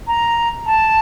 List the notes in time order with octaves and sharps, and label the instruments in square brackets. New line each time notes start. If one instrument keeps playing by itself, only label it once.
[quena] A#5
A5